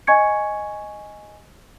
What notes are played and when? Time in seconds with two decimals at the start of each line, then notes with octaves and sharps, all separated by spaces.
0.07 D#5 G#5 C#6 G#6 C#7